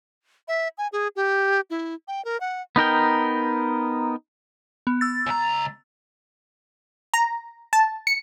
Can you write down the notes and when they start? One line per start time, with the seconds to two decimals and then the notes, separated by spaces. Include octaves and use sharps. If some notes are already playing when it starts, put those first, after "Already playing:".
0.48 E5
0.78 G#5
0.92 G#4
1.16 G4
1.70 E4
2.08 G5
2.25 A#4
2.40 F#5
2.76 B3 D#4 A#4 G5
4.87 B3
5.01 E6 A6
5.26 C#2 A#5
7.14 A#5
7.73 A5
8.07 C#7